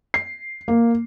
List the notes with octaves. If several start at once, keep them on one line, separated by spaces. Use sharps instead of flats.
C7
A#3